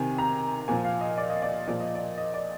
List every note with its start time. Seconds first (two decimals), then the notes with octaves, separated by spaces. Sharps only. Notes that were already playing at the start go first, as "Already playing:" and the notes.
Already playing: C3 D#3 G#5
0.18 A#5
0.68 A#2 F3 G#5
0.85 F5
1.01 D#5
1.18 D5
1.30 D#5
1.42 D5
1.68 A#2 F3 D5
1.80 D#5
1.95 D5
2.18 D#5
2.34 D5